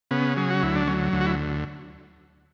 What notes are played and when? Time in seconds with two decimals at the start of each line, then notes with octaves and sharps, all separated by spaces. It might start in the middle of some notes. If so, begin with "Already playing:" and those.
0.11 C#3 B3
0.37 F#3 G#4
0.50 F#4
0.62 D2 E4
0.76 D4
0.87 F#3 C#4
1.13 D2
1.21 F#4
1.26 E4